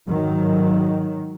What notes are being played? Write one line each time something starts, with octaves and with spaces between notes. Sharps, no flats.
G#2 D#3 F#3